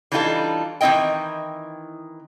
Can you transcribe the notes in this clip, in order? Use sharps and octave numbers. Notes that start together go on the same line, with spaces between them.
E3 G3 D4 D#4 F4 A4
D#3 E3 C4 E4 D#5 G5